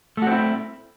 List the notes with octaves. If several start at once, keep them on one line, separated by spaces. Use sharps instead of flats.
A3 C4 E4 F#4